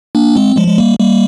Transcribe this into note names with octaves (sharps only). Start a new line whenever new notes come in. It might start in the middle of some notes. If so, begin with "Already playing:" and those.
A#3 D4
G#3 C4
F3 G#3
G#3
G3 A#3
G3 A#3